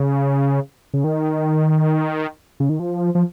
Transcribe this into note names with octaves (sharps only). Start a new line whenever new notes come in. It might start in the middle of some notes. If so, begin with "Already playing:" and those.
Already playing: C#3
C#3
D#3
C#3
D#3
F3
F3